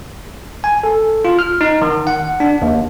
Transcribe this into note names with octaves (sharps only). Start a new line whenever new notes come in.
G#5
A4
F4
F6
D#4
D#3
F#5
D4
D#2